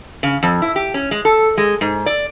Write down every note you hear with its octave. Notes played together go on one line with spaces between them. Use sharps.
C#3
F2
E4
G4
C#4
G#3
A4
G#3
G#2
D5